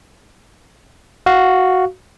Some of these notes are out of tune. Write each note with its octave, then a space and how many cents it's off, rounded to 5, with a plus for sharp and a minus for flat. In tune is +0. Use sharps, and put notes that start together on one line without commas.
F#4 +0 F5 +0